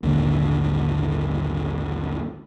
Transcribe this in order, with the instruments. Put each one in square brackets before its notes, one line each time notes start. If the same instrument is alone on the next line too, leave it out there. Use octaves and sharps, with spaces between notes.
[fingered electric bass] A#1 D#2 G#2 D3